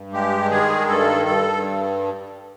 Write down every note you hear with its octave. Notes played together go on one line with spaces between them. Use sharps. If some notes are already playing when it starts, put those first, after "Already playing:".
Already playing: G2
G#3 G4
D#3 G#4
G2 A4
G2 A4